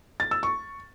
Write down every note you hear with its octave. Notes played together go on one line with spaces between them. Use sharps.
A6
E6
C#6